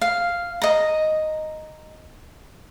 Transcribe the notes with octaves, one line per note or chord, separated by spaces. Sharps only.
F5
D#5 A#5